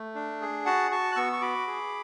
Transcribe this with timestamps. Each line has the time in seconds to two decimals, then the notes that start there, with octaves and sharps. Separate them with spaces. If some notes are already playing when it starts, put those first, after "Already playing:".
Already playing: A3
0.15 D4
0.41 G#4
0.65 F#4 F#5 A5
0.91 F#4 A5 C#6
1.12 F#6
1.16 B3 C#6 E6
1.33 C#6
1.41 F#4 B5 D6
1.67 G#4